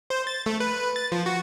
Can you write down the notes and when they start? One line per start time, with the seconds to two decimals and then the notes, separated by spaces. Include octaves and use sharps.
0.10 C5
0.27 A6
0.46 A3
0.60 B4
0.96 A6
1.12 F3
1.26 F#4